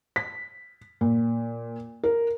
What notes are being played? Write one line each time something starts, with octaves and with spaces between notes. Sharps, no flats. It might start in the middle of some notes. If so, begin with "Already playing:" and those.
B6
A#2
A#4